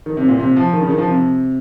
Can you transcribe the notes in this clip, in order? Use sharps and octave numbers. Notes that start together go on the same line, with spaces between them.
D#3
C3
A#2
C3
F3
D#3
C#3
D#3
F3
C3